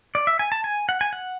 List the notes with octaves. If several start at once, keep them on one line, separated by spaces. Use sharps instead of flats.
D5
E5
G#5
A5
G#5
F#5
G#5
F#5